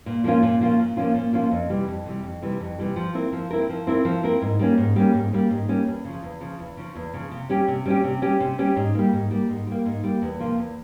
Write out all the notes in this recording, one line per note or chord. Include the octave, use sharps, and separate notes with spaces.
A#2
F3 A#3 C#4 F4
A#2
F3 A#3 C#4 F4
A#2
F3 A#3 C#4 F4
A#2
F3 A#3 C#4 F4
F2
C3 E3 G3
F2
C3 E3 G3
F2
C3 E3 G3
F2
C3 E3 G3
F3
C4 E4 A#4
F3
C4 E4 A#4
F3
C4 E4 A#4
F3
C4 E4 A#4
G#2
G3 A#3 C#4
G#2
G3 A#3 C#4
G#2
G3 A#3 C#4
G#2
G3 A#3 C#4
E2
C#3 F3
E2
C#3 F3
E2
C#3 F3
E2
C#3 F3
C3
G3 C#4 G4
C3
G3 C#4 G4
C3
G3 C#4 G4
C3
G3 C#4 G4
G#2
G3 A#3
G#2
G3 A#3
G#2
G3 A#3
G#2
G3 A#3
E2
C3 F3 A#3 F4
E2